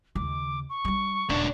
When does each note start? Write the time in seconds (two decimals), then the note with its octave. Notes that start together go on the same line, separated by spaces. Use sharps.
0.15 D#2 C#3 D6
0.69 C#6
0.85 G3 D4
1.29 D#1 C#2 D4